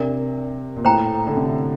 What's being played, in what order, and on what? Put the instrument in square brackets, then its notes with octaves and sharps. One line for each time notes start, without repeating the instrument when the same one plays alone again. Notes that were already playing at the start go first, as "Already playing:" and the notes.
Already playing: [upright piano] C3 [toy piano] D4 A#4 D5
[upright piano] A#2
[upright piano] A2 [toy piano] C5 G5 A#5
[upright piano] D3
C3